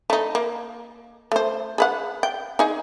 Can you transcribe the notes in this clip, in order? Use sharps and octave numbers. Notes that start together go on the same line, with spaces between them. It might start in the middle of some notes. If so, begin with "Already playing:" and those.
A3 D#4
A#3
A3 C5
G#4 B4 F#5
G5
D#4 G#4